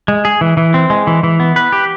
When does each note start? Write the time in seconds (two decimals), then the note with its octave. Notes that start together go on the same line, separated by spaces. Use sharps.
0.08 G#3
0.25 G#4
0.41 E3
0.57 E3
0.74 C4
0.90 G#3
1.07 E3
1.23 E3
1.40 B3
1.56 B4
1.72 G4